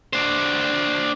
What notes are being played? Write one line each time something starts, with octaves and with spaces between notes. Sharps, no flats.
D4 C5